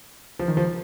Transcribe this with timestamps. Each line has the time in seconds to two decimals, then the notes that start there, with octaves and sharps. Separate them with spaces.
0.39 F3
0.48 D#3
0.57 F3